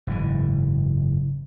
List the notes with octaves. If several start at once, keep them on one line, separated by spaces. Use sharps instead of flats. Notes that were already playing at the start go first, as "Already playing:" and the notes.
F#1 G#2 E3